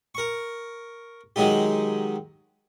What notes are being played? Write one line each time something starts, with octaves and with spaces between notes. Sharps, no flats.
A#4 C#6
D#3 F#3 G#3 D#4 G4